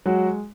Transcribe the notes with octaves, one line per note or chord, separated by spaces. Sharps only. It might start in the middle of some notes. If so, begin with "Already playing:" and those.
F#3 G#3 F#4